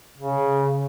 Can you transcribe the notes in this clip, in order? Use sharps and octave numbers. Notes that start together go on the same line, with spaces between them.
C#3